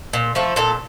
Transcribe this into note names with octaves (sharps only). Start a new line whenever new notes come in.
A#2
F3 A3
A#2 A4